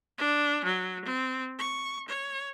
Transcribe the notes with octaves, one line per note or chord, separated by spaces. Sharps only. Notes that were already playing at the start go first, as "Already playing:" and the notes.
D4
F#3
C4
C#6
C#5